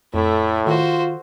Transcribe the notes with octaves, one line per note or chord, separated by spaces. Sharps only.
F2 A2 A3 E4
D#3 F4 F#4 C5